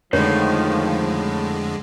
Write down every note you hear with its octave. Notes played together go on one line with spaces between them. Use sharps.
F2 A2 D3 D#3 F3 G#3 C#5